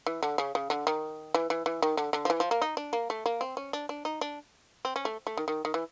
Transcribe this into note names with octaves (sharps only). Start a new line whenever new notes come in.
E3
D3
C#3
C#3
D3
D#3
E3
E3
E3
D#3
D3
D3
F3
E3
F3
A#3
D#4
D4
A#3
A3
A#3
C4
C#4
D4
D4
D#4
D4
C4
C#4
A3
A3
D#3
D#3
D#3
E3